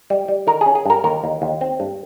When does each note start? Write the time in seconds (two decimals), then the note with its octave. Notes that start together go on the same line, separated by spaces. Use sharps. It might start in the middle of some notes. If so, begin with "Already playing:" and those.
0.10 G3
0.28 G3
0.47 D#3 A#4
0.61 G#4
0.66 C#4
0.75 G#4
0.86 G2 A#4
1.04 D#2 A#4
1.24 D#2
1.42 D#2
1.61 C4
1.80 G2